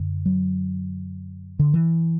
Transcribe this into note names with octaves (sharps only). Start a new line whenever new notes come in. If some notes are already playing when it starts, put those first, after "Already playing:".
Already playing: F#2 D3
F#3
D3
E3